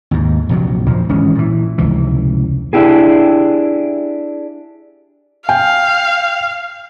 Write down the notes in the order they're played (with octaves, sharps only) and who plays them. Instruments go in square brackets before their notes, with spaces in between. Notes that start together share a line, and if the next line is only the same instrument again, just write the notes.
[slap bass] D#2 G#2
A#1 F2 C3 F#3
A#1 A#2 F3
G#1 E3 G#3 C#4
A#2 E3
F1 C#2 E3
[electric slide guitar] D4 E4 G4 G#4
[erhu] F5 [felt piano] G5